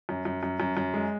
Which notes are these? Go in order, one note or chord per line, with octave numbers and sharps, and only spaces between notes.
F#2
F#2
F#2
F#2
F#2
G#3